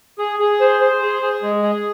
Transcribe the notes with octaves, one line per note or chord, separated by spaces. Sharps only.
G#4
G#4
C5
C5
G#4
G#4
G#3
G#4